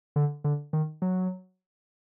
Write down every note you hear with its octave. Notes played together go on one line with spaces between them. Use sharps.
D3
D3
D#3
F#3